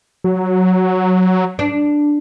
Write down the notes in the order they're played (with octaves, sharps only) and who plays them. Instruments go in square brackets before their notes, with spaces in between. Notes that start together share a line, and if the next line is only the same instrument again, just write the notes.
[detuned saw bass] F#3
[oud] D4